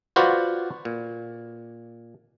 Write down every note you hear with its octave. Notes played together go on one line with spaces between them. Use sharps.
F4 F#4 B4 C5 D5 F#5
A#2